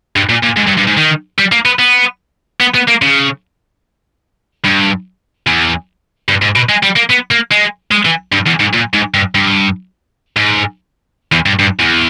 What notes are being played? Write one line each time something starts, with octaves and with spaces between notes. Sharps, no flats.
G2
A#2
A#2
G#2
G2
G2
G#2
D#3
G3
A#3
B3
B3
B3
B3
A#3
C#3
G2
E2
G2
G#2
B2
G#3
G3
A#3
B3
A#3
G#3
G#3
E3
G2
E2
G#2
A#2
G#2
G2
G2
G#2
E2
G2
G2
E2